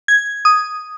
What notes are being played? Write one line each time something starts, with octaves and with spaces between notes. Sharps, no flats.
G#6
D#6